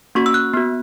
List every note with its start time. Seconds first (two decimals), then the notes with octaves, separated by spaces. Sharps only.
0.15 A#3 C#4 F#4 C#6
0.26 E6
0.34 F#6
0.53 B3 F#4